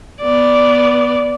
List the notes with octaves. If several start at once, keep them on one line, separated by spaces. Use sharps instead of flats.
B3 D5